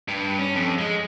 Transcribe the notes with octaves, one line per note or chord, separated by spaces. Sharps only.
G2
C#4
F2
G#3